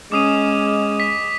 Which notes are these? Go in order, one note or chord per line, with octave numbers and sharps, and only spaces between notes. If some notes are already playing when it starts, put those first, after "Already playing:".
G#3 C#4 D6 D#6 D#7
B6